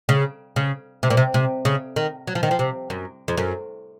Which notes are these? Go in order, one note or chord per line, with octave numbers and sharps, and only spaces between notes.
C#3
C#3
C3
A#2
C3
C3
C#3
D#3
F#3
F3
D#3
F3
C3
F#2
F2
F#2